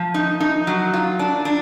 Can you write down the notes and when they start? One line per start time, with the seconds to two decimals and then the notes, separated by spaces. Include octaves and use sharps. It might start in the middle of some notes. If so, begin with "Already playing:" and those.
Already playing: F3
0.14 D#4
0.40 D#4
0.67 F#3
0.94 F4
1.19 D4
1.45 D4